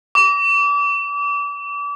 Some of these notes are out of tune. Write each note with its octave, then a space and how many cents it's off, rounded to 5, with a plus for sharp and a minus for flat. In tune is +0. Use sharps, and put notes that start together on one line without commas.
D6 -35